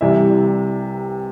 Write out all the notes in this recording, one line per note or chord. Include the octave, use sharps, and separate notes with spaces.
C2 C3 E3 G3 E5